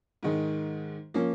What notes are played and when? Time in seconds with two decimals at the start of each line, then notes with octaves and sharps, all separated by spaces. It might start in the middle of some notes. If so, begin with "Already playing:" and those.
0.23 G#2 D#3 G#3
1.14 F3 A#3 C#4